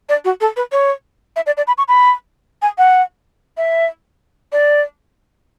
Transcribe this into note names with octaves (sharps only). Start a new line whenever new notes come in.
D5
F#4
A4
B4
C#5
E5
D5
D5
B5
C#6
B5
G#5
F#5
E5
D5